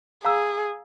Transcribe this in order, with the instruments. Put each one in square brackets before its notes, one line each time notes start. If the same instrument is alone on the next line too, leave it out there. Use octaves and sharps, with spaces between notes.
[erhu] G#4 [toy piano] F5 A#5 E6